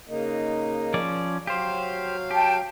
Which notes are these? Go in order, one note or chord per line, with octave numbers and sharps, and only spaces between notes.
C#3 A#3 D#4
F3 C#4 D5
F#3 G4 C5 F5
G4 G5 A5